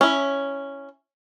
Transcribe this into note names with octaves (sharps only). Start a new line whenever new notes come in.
C#4 E4